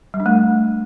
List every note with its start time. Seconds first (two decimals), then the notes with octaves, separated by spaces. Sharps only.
0.14 G3
0.20 D4
0.26 A3